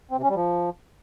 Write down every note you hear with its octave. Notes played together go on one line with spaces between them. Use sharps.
C4
C3
C#4
G3
F3